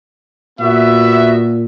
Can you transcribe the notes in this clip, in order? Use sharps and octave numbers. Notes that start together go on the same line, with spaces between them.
A#2 B3 F#4 E5